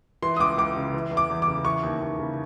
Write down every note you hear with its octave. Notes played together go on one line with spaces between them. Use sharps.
E3 C6
D#6
C#2 D6
C#2 D6
C#3
E3
E2
D6
E2
D6
C#3
E3 C#6
D#2
D#2
C#3